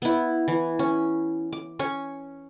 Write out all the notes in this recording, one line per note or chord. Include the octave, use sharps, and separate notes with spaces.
B3 E4
E3
C#4
D6
C#4 C#6